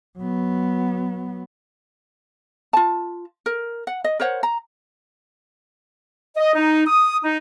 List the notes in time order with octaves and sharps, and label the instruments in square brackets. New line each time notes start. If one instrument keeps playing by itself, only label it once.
[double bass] F#3 B3
[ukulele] F4 A5
A#4
F#5
D#5
A#4 C5 C#5 F#5
A#5
[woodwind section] D#5
D#4
D#6
D#4